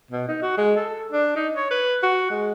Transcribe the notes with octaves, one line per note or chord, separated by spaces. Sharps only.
B2
D#4
F#4
G#3
A4
D4
D#4
C#5
B4
F#4
G#3